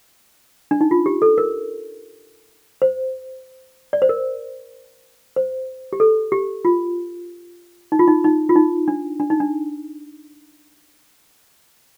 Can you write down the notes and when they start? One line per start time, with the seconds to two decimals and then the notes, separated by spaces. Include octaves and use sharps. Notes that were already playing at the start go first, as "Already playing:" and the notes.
0.71 D4
0.81 D#4
0.91 F4
1.06 G4
1.22 A4
1.38 A#4
2.82 C5
3.93 D5
4.02 C5
4.09 A#4
5.36 C5
5.93 G4
6.00 A4
6.32 G4
6.65 F4
7.92 D#4
7.99 F4
8.08 D#4
8.24 D#4
8.49 F4
8.55 D#4
8.88 D4
9.20 D4
9.30 D#4
9.40 D4